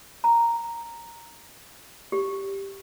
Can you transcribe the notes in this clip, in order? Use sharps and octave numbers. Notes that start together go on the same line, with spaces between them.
A#5
G4